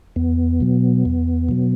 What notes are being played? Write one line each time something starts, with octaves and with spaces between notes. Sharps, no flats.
E2 B3
B2 F#3
E2
B2 F#3